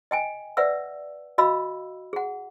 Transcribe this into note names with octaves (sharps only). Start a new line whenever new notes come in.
D#5 G5 G#5
B4 D5 E5 F#5 E6
F#4 D#5 F5 B5 E6
G#4 F#5